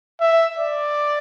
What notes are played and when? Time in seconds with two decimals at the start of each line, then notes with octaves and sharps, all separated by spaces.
0.20 E5
0.58 D5